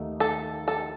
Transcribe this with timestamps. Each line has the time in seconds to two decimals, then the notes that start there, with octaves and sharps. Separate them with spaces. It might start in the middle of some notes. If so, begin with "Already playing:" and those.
Already playing: D#2 D#3 A3 D#4
0.20 A4
0.68 A4